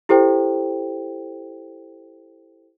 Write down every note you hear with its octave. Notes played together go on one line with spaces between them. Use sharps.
E4 G4 A4 C5 G5